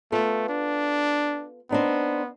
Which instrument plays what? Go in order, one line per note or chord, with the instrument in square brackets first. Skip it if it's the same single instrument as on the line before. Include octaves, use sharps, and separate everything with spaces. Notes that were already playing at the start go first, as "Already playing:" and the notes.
[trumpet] A3 [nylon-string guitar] B3 F4 A4
[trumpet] D4
[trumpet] B3 [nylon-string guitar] C4 D4 D#4